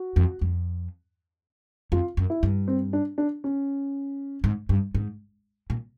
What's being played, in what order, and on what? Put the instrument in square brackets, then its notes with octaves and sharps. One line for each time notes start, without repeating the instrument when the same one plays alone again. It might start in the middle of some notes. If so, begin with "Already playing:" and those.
Already playing: [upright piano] F#4
[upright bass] F2
F2
[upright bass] F2 [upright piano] F4
[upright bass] F#2
[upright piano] E4
[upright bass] G2
[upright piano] C4
D4
D4
C#4
[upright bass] G#2
G2
G#2
A#2